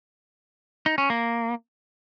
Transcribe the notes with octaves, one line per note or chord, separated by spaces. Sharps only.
D#4
C#4
A#3